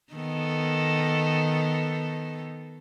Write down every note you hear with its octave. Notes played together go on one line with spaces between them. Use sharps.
D#3 B3 A4